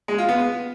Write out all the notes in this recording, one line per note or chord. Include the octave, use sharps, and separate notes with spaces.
G#3
F4
B3